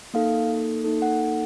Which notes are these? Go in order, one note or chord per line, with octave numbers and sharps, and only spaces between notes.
A#3 D#4 A4 F5
A#3 D#4 A4
F#5
F#5